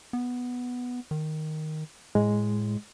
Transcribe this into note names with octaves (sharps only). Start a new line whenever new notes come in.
B3
D#3
A2 G#3